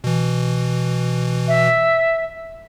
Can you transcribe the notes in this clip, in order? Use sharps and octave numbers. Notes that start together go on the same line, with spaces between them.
B2 E3
E5